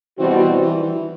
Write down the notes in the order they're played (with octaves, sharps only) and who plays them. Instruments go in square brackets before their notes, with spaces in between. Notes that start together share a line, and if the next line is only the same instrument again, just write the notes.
[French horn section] B2 G3 C4 F#4 [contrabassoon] E3
[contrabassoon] E3
E3
E3